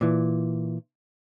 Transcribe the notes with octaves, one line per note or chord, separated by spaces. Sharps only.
A#2 E3